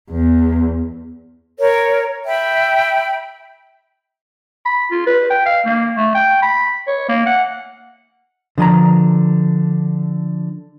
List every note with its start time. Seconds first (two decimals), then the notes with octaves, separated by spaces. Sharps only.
0.11 E2
1.59 A#4 C#5
2.25 E5 G5 B5
4.65 B5
4.91 F4
5.06 B4
5.30 G5
5.46 F5
5.65 A#3
5.96 A3
6.14 G5
6.42 B5
6.87 C#5
7.09 A#3
7.26 F#5
8.58 D3 F3 G#5 A#5